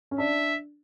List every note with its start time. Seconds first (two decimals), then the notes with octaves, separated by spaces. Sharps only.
0.11 C#4
0.18 D4 E5